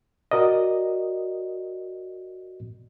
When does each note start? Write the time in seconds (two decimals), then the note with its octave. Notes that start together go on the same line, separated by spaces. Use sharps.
0.31 F#4 A#4 D5 D#5